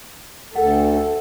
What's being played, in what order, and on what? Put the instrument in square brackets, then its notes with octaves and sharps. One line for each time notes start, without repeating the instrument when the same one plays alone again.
[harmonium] D2 [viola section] A4 [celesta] F#5